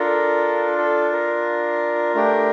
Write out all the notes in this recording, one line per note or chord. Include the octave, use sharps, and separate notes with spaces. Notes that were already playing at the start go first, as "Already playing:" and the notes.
Already playing: D4 F4 A4 A#4
A4
A#4
A3 D4 G4